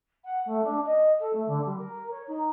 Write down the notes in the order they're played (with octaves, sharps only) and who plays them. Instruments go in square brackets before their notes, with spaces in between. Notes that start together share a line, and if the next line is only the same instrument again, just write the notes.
[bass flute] F#5
A3
D4
D#5
A4
A3
D3
G3
A#4
C#5
D#4